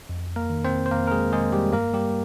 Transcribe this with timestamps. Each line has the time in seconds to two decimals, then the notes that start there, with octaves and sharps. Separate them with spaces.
0.09 F2
0.36 A#3 A#4
0.50 D#3
0.65 C4 C5
0.86 C5
0.91 F2 A#3 A#4
1.07 A#4
1.11 G#3 G#4
1.32 D#3 G#3 G#4
1.52 G3 G4
1.73 G2 A#3 A#4
1.93 G3 G4